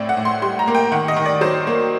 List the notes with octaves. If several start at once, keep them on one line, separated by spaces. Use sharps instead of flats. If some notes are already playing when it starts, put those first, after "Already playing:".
Already playing: A2 C4 D5
F#5
A2
C6
G3 C6
A#5
A#3
G5
D#3 F#5
D#5
D#3
D5
F#3 C5
A#3